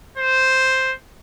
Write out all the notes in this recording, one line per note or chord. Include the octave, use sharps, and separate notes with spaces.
C5